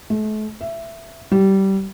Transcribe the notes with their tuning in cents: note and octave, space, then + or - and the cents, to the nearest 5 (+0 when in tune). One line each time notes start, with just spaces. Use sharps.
A3 -40
E5 +15
G3 -20